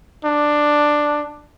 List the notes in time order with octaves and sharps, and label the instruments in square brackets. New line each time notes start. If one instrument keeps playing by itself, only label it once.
[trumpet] D4